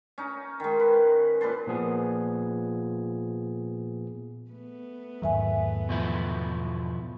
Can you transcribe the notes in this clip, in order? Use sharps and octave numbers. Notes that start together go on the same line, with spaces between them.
C#4 D#4
D#3 G#3
B4
A#2 B4 A5 C6
A#2 F3 B3 G#4
A3 B3
E2 G#2 D#3 F#3 E5 G#5
B2 F3 E4